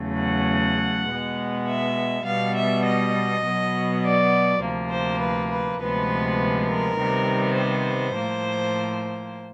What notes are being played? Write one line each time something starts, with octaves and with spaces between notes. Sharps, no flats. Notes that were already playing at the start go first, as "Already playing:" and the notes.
Already playing: E2 C#3 F#3 A3
F#5
B2 G#3 B3
E5
B2 G3 B3 F5
E5
D#5
B2 F#3 B3
D5
D2 C3 F3 A#3
C5
B4
B4
D2 C3 F3 G#3 B3 B4
A#4
C3 D#3 G3 B3
C5
A2 F3 A#3